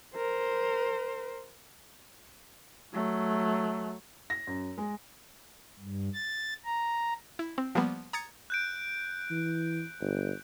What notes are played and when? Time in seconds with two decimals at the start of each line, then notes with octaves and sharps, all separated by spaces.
0.15 A#4 C5
2.94 F#3 A3
4.30 A#6
4.47 F#2
4.78 G#3
5.79 G2
6.14 A6
6.65 A#5
7.39 E4
7.58 C4
7.75 F3 G3 A#3 B3
8.13 A#5 D#6 G#6 A6 C#7
8.50 F#6 G6 D7
9.31 E3
10.01 G1